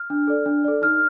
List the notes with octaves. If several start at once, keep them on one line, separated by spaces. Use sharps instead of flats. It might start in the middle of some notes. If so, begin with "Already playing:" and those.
Already playing: F6
D4
A4 D5
D4
A4 D5
D#4 F6